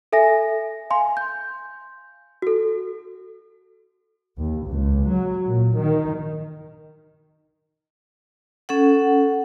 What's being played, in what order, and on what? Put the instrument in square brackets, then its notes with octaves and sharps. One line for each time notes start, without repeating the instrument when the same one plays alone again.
[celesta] A4 E5 G#5 A#6
F5 G#5 C6
G6
F#4 A4
[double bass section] D#2
C#2
F#3
A#2
D#3
[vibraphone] C#4 A4 F#5